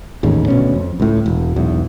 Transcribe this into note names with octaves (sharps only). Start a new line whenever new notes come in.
A1 D#2 G#2 C#3
D2 B2 C#4
F2
C#2 A2
E1
E1 B1 E2